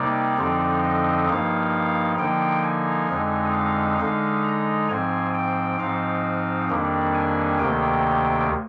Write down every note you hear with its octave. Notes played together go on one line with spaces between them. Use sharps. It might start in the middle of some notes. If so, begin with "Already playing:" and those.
Already playing: C3 G3 A#3 D#4 D5
F2 D3 F3 C4 D#4
D#5
G2 F3 A#3 D#4 F5
D3 F3 A#3 D#4 G5
G#5
F2 D3 G#3 D#4
F5
D3 G#3 D#4 F5
A#5
G#2 F3 C4 G#5
G5
G#2 F3 C4 D#4 F5
F2 D#3 G3 A#3 D4
G#5
D2 C3 D#3 A#3 G5